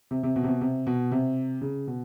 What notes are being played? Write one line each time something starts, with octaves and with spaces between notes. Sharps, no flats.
C3
C3
B2
C3
B2
C3
B2
C3
C#3
B2